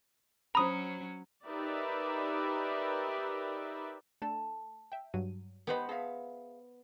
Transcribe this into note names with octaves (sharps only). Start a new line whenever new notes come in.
F#3 C#4 C5 A#5 B5 D#6
D#4 G4 A#4 B4 D5 E5
A3 D4 A4 A5
E5 G5
G2 F#3 D#7
B3 G4 B4 C5 D#5 B5
G#4 E5 F5 A5 A#6 B6